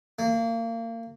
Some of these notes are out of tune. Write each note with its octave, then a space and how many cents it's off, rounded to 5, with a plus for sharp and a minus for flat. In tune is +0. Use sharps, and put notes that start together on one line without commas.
A#3 -30